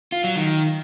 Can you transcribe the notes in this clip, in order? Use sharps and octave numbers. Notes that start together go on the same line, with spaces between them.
F4
F#3
D#3